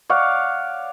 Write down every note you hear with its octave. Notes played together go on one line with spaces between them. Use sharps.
C#5 D5 F5 F#5